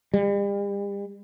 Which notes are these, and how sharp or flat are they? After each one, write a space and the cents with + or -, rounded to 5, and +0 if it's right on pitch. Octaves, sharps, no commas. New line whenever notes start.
G3 +40